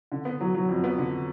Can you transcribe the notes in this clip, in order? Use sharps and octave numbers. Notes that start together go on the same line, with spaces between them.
D3
B3
F#3
F#3
F2
B3
D3